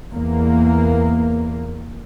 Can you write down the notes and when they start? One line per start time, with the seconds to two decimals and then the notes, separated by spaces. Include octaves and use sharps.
0.13 E2 A#3